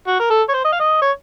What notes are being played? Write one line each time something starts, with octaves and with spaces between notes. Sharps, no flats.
F#4
A#4
A4
C#5
C5
D#5
F5
D#5
C#5